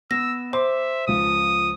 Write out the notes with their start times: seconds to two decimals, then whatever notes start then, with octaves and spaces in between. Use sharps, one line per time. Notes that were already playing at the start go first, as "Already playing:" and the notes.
0.11 B3 E6 A#6
0.53 C5 E5 C6 D6
1.07 C#2 F3 D#6